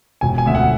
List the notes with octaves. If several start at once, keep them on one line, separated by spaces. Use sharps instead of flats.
E1 G#5
G#5
D2 D3 E5
F#5